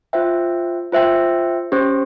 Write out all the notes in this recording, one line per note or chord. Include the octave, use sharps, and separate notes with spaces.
F4 C5 E5 G5
F4 C5 E5 G5
C#4 G4 C5